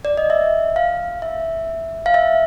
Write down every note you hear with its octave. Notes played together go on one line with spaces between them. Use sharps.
D5
D#5
E5
F5
E5
F5
E5